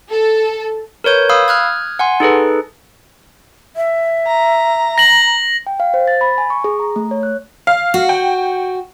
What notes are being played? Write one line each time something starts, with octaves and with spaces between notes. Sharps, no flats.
A4
A#4 B4 C#5 G6
F5 B5 D#6 E6
D#6 F6 F#6 G#6
F#5 G#5 C6
D#4 G#4 A4 B4
E5
A#5
A#6 F#7
G5
F5
C5
A6
B5
G#5
C#6
G#4
A#5
A3
C#5
F#6
F5
F#4
G5